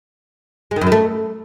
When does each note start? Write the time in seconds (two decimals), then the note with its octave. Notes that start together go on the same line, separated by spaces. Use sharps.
0.71 G#3
0.76 D#3
0.81 F#2
0.87 D#3
0.92 A3